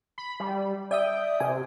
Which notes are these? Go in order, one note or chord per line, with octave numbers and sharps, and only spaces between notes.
B5
G3
D5 E5 G5 D#6
C3 G#5